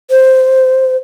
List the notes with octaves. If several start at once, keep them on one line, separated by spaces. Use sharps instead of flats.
C5